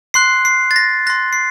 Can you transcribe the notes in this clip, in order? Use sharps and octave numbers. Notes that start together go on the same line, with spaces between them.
C6 F#6 C7
C7
A6
A#6
C6 F#6 A#6
C7